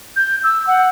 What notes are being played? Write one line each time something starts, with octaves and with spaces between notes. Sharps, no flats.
G6
E6
F#5